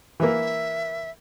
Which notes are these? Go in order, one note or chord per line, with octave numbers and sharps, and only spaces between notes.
E3 A#3 E5